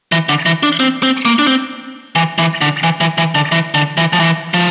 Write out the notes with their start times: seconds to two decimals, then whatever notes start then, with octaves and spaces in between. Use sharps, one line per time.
0.12 E3
0.29 D3
0.46 E3
0.63 D4
0.80 C4
1.03 C4
1.25 A#3
1.39 D4
1.47 C4
2.16 E3
2.38 E3
2.61 D3
2.83 E3
3.01 E3
3.18 E3
3.35 D3
3.52 E3
3.74 D3
3.98 E3
4.13 F3
4.20 E3
4.54 F3